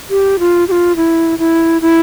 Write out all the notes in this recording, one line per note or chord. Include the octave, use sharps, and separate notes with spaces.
G4
F4
G4
F4
E4
E4
E4